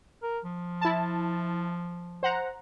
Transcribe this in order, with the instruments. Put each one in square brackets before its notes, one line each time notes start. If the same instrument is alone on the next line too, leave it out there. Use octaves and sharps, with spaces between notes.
[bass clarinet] A#4
F3
[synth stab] E4 A5
C5 F#5 A#5